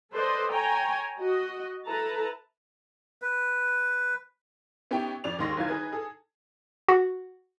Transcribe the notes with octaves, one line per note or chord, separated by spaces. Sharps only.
A4 B4 C5 D5 D#5
C#5 G5 G#5 A#5
F#4 D#5
E4 A4 B4 A5 A#5
B4
B3 C#4 D#4 G4 E5 G5
F2 C#4 D5 F7
D#2 D#3 G#3 C6 C#6 A#6
G1 D#3 F4 G#6
D#4 G#4 B4 G#6
G#4 A4
F#4